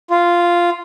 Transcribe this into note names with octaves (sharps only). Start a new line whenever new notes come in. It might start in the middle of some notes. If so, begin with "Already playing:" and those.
F4